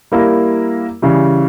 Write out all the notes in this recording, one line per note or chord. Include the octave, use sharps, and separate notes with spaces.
G3 A#3 E4 A#4
C#3 E3 G3